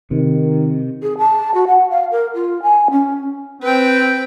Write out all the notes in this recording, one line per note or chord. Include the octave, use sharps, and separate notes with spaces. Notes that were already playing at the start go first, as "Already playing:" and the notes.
C3 D#3
G#4
A5
F#4
F#5
F5
A#4
F4
G#5
C#4
C4 B4 G5